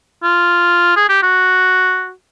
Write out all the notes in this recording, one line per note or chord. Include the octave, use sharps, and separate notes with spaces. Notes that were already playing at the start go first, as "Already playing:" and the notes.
F4
G#4
G4
F#4